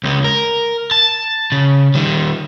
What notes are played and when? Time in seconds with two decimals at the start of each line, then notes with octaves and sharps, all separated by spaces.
0.03 C#2 G#3
0.24 A#4
0.91 A5
1.52 C#3
1.95 D#3 G3